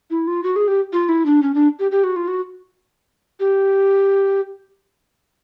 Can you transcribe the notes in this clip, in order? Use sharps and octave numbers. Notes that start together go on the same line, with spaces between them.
E4
F4
F#4
G#4
G4
F4
E4
D4
C#4
D4
G4
G4
F#4
F4
F#4
G4